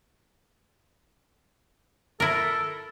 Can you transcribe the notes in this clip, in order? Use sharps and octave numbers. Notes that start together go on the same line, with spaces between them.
E4 A4 A#4